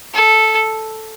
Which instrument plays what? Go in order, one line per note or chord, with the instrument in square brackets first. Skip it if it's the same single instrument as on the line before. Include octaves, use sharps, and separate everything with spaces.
[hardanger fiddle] A4